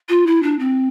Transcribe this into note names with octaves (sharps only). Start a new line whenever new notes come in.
F4
E4
D4
C4